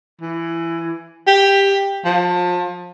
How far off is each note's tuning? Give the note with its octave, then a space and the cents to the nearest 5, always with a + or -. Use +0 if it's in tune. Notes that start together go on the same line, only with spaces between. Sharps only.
E3 +20
G4 +10
F3 +30